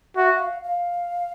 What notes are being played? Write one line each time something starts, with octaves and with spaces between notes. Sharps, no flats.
F#4 E5
F5
F5